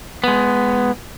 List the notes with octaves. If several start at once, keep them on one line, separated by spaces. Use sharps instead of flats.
G#3 B3